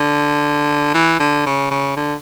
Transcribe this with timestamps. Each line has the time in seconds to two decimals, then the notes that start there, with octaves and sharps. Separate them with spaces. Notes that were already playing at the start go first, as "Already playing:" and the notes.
Already playing: D3
0.94 E3
1.19 D3
1.46 C#3
1.71 C#3
1.96 D3